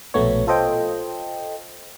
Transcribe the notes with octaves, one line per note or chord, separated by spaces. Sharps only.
A#1 B2 A3 B3 C#5
F4 A4 C5 D#5 G5